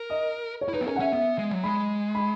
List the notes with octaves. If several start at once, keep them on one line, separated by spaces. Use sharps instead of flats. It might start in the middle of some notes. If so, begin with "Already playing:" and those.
Already playing: A#4
D#5
C#5
E4
D#4 B4
B3
C#4 A#4
F#5
C#4 E5
B3 E5
G#3
F#3
G#3 B5
B5